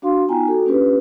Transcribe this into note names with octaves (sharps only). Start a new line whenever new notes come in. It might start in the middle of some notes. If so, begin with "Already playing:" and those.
D4 F#4 F5 C6
B3 D#4 F4 G5 G#5 A#5
F#4 A4
A#3 C#4 D4 F4 G4 B4